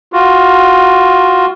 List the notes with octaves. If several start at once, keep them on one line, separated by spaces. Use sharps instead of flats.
F4 F#4